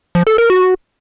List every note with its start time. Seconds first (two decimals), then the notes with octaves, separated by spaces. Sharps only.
0.15 F3
0.27 A4
0.38 A#4
0.50 F#4